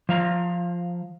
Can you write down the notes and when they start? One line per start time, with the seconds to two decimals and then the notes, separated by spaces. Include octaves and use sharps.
0.09 F3 F5 A#5